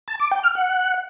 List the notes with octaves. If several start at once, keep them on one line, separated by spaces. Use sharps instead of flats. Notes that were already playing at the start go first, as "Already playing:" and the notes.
A5
D6
G5
F6
F#5